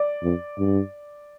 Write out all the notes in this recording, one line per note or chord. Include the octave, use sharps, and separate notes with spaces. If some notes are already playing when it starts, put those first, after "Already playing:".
Already playing: D5
F2
G2